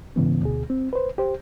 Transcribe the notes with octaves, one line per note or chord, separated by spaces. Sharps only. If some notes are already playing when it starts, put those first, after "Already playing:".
G#2 C#3 E3 B3
D2 B2 G#4
C4
B4 C5
G4 C5